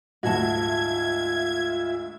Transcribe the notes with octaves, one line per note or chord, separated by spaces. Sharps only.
D2 G#2 F4 F#4 E5 A5 G#6